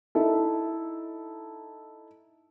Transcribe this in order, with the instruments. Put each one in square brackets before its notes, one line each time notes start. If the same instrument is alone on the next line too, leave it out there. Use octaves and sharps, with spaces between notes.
[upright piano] D#4 E4 A4